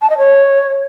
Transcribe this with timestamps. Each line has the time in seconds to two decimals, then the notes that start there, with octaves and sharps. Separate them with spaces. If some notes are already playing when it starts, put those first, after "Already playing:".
0.02 A5
0.10 D#5
0.18 C#5